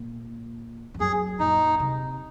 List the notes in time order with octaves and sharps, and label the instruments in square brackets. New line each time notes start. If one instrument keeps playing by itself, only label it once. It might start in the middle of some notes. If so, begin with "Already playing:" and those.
Already playing: [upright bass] A#2
F2
[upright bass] F#2 [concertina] G#4
[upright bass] A#2 [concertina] D#4
[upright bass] C3